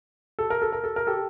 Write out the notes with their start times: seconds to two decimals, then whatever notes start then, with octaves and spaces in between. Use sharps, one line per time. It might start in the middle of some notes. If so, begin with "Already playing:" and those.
0.39 A4
0.50 A#4
0.62 A4
0.73 A#4
0.84 A4
0.96 A#4
1.07 G4 A4